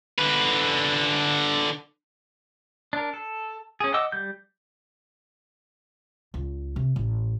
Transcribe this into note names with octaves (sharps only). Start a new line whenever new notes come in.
D3 B4
D4 A#4
A4
C#4 G#4
D#5 F#5 D6 E6
G3 G6
C#2
C3
A1